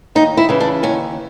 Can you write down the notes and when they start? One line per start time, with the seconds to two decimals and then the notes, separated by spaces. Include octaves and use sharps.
0.15 D#2 D#4
0.37 E4
0.49 C#3 E3
0.60 D4
0.83 D#2 C#4